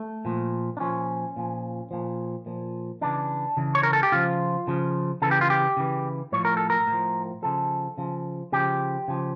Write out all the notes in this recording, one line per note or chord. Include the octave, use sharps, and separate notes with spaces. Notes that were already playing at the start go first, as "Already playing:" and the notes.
Already playing: A3
A#2 F3
D4
A#2 F3 C#4
A#2 F3
A#2 F3
A#2 F3
C#3 E3 D4
C#3 E3
C#5
A#4
A4
G4
C#3 F3 F4
C#3 F3
C#3 E3 A4
G4
F4
G4
C#3 E3
A2 F3 C#5
A#4
A4
A#4
A2
F3
C#3 F3 A4
C#3 F3
C#3 F3 G4
C#3 F3